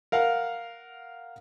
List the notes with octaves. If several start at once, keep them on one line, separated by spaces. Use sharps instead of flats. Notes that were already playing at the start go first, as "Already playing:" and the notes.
A#4 F5 F#5